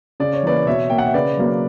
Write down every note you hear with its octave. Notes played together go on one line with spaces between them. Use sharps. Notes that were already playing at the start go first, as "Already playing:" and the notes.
C#3 D5
C#5
E3 A#3 B4 D5
B2 C#5 E5
A#3 G5
F#5
E5
C#3 B4 D5
F#3 A#3